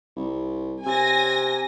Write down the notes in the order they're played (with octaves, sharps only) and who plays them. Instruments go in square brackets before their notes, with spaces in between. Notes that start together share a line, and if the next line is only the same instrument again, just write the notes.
[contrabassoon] C2
[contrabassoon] C3 [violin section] G#5 A#6